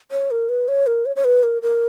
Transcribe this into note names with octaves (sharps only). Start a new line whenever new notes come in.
C#5
A#4
B4
C#5
A#4
C#5
C#5
B4
A#4
A#4